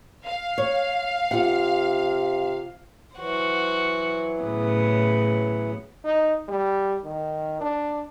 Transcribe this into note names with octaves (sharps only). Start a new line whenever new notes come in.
F5
C#5
C3 F4 F#5
E3 F#3 F#4 C5
A2 C#3 B3
D#4
G3
D#3
D4